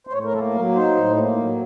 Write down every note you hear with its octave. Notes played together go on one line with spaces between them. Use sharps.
C5
A2 C#5
A#4
A#3 A4
F#3 A#4
D#4 C5
A2
A#3
F#3